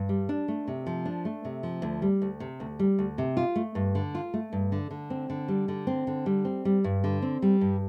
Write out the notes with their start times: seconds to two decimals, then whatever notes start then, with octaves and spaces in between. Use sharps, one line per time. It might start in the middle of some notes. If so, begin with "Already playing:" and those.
Already playing: G2
0.09 G3
0.29 D4
0.48 A3
0.68 C3
0.86 F3
1.05 D4
1.25 A3
1.45 C3
1.63 F3
1.82 D2
2.02 G3
2.22 D2
2.40 C3
2.60 D2
2.79 G3
2.99 D2
3.18 C3
3.37 F4
3.56 A3
3.75 G2
3.95 D3
4.15 F4
4.34 A3
4.53 G2
4.72 D3
4.91 D3
5.10 C4
5.30 D3
5.48 G3
5.68 D3
5.87 C4
6.07 D3
6.26 G3
6.45 C4
6.65 G3
6.84 G2
7.04 D3
7.22 C4
7.42 G3
7.61 G2